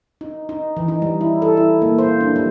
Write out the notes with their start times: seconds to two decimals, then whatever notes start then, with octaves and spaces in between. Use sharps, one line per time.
0.21 D#4
0.49 D#4
0.77 E3
0.88 D#4
1.02 G3
1.21 E4
1.42 A4
1.57 E4
1.82 A#3
1.99 C5
2.21 D4
2.36 G3